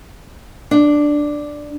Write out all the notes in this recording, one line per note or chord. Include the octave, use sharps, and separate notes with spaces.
D4